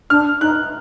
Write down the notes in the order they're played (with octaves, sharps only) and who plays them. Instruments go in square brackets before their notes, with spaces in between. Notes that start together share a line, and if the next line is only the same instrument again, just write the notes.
[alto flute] D4 [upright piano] F6
[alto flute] D#4 [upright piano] F#6